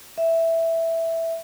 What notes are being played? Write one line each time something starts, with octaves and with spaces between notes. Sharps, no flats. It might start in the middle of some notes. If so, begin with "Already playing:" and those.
E5